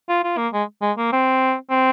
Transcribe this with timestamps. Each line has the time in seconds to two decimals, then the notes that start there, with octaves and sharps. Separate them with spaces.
0.09 F4
0.24 F4
0.38 A#3
0.53 G#3
0.82 G#3
0.98 A#3
1.13 C4
1.71 C4